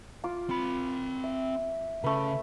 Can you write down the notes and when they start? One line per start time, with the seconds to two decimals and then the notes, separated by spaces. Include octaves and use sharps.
0.24 F4 D6
0.50 C4 B5
1.24 E5
2.04 C#3 A3 C#4 B4